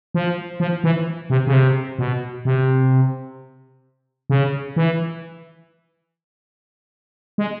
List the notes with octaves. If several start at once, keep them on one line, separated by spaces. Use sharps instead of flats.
F3
F3
E3
C3
C#3
C3
B2
C3
C#3
E3
G#3